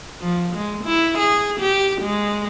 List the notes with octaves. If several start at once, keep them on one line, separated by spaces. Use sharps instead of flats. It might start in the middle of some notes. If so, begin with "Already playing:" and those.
F3
G#3
E4
G#4
G4
G#3